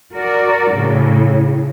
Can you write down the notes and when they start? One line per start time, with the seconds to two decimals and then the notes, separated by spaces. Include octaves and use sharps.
0.13 F#4 A#4 D5
0.71 A2 C#3